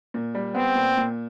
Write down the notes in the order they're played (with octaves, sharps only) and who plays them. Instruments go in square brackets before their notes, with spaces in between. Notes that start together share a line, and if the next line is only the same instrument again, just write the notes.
[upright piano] A#2
G3
[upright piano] B3 [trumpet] C4
[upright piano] A#2
A#2